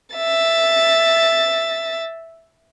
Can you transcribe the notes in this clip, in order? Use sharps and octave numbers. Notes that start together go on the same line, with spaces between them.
E5 A6